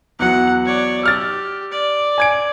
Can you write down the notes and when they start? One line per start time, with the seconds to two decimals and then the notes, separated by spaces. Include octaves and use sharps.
0.19 E2 F#3 F#5
0.65 C#5 D5
1.03 G4 E6 F6 A6
1.72 D5
2.18 G#5 G#6 D7